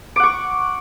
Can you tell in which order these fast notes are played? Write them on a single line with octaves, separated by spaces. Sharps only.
D6 F#5 C#6